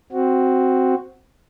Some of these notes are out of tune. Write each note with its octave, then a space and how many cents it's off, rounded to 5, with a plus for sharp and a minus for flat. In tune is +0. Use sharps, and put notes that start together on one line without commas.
C4 +0 F#4 +0